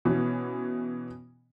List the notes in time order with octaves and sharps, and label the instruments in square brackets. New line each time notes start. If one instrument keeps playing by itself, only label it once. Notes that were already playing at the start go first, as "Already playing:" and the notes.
[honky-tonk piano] B2 E3 B3 C#4